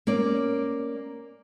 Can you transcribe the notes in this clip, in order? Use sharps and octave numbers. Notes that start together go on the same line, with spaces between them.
A#3 C#4 D5